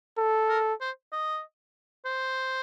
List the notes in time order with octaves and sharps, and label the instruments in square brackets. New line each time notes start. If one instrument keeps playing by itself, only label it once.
[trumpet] A4
[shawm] A#4
C5
D#5
C5